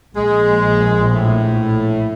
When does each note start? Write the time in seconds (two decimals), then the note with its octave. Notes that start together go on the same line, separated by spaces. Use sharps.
0.16 A#1 G#3
1.12 A2